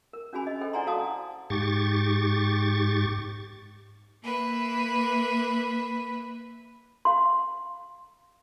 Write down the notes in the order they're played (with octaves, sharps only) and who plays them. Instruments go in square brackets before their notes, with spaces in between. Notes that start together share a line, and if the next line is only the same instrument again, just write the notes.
[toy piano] A#4
C#4 D4 F#4 G#4 G#5 B5
D#5
A4 C5 G5
E4 D5 F#5 G#5 A#5 C6
F#4 A4 F5 A5 D#6
[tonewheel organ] G#2 G4 C#6 A6
[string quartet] A#3 B4 E5
[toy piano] F5 C6